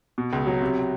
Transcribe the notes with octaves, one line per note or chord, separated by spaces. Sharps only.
B2
C#2
F#3
C3